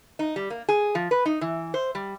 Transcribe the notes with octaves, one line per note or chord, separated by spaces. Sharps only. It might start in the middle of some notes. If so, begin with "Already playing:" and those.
D#4
G3
A#3
G#4
F3
B4
D#4
E3
C5
G3